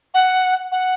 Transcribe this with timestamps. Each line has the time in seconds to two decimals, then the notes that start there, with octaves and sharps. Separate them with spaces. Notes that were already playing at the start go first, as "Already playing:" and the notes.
0.14 F#5
0.72 F#5